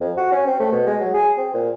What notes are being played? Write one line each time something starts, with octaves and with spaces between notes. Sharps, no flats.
F2
F#4
C#4
C4
A3
B2
G#3
F#3
G#4
C4
A#2